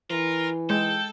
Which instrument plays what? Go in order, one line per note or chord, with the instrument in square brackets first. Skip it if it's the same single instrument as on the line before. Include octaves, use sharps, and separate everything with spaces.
[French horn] E3 [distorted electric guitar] F4 [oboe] A#4
[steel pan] G#3 [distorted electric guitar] A4 [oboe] G5